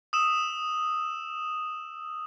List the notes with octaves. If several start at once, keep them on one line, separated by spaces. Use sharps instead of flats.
D#6 E6 E7